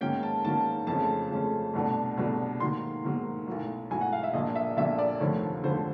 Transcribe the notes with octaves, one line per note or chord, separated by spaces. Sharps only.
G#2 D#3 F#3 A#3 C#4 G5
A5
G#2 D#3 F#3 A#3 C#4 A5
F2 C#3 F3 A3 C#4 A5
F2 C#3 F3 A3 C#4
C2 B2 F#3 A3 D4
C2 B2 F#3 A3 D4
G#2 D#3 F#3 A#3 C6
G#2 D#3 F#3 A#3
B1 A2 F#3
B1 A2 F#3 G#5
F#5
F5
E5
A#1 A#2 F#3 A#3 D4 D#5
E5
A#1 A#2 F#3 A#3 D4 E5
D5
F1 D#2 D3 F3 A3 C#5
F1 D#2 D3 F3 A3 C5